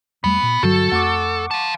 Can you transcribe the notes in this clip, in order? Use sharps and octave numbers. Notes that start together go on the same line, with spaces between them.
E2 G3 A3 B3
A#2
G2 D3 F#3 F#4 A4
F2 A3 F#5 C#6 D6
F5 A5